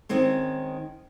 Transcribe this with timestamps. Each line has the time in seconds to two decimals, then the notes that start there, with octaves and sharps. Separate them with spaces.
0.09 D#3 G#3 C4 C#4